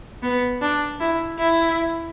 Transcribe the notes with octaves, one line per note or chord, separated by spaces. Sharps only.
B3
D4
E4
E4